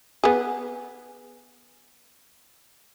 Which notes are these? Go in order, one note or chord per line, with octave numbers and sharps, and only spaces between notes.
B3 G#4